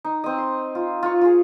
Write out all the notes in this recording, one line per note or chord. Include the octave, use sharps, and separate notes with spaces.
D#4
C4 D#5
C6
F4
F4 C#6
F4 G#4